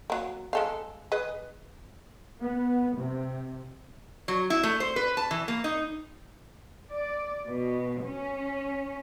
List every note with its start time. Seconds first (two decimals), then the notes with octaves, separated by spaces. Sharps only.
0.10 F#3 A#3
0.53 G#3 A4 F5
1.12 G#4 B4 D#5
2.41 B3
2.97 C3
4.28 F#3
4.50 E4
4.63 A3
4.80 C5
4.96 B4
5.17 A5
5.31 E3
5.48 A#3
5.64 D#4
6.91 D5
7.49 B2
8.04 C#4